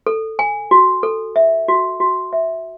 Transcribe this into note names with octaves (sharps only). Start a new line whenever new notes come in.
A4
G#5
F#4
A4
E5
F#4
F#4
E5